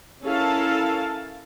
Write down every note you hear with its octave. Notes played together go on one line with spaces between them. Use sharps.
C#4 E4 A4 A#4 F5 A5